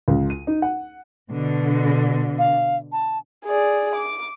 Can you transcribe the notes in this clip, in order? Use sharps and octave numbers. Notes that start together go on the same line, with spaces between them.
C#2
D#7
D#4
F#5
B2 D3
F5
A5
G#4 D5
D6